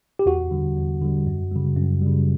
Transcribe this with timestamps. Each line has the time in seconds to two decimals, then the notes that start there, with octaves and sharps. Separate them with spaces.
0.19 G4
0.26 E2 F#4
0.51 D3 G3
0.77 E2
1.02 D3 G3
1.27 F#2
1.52 C#3 G3
1.77 F#2
2.02 C#3 G3